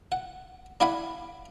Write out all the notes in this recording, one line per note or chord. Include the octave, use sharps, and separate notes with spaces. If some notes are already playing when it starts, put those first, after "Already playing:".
F#5
D4 E4 F5 F#5 G#5 B5